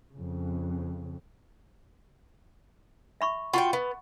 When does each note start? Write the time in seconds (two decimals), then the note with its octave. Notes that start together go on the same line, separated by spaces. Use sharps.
0.12 F2 C#3
3.21 E5 B5 C#6
3.53 F4 F#4 F#5 G5 B5 C#6
3.73 B3